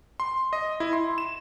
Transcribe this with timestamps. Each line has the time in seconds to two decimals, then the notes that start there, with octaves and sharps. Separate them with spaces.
0.20 C6
0.53 D#5
0.80 E4
0.93 C6
1.18 E7